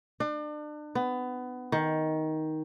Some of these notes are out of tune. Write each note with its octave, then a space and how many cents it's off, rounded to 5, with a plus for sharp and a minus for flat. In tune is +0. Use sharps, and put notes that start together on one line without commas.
D4 +35
B3 +20
D#3 +10